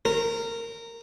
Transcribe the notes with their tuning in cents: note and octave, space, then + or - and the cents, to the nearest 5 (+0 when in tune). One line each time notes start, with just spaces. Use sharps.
A#4 -15